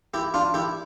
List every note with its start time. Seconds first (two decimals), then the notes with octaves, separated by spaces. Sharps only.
0.14 E4 G4
0.34 D4 F4
0.54 E4 G4